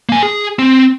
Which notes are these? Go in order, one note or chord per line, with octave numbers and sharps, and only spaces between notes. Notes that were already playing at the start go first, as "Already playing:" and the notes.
A#3 G#5
G#4
C4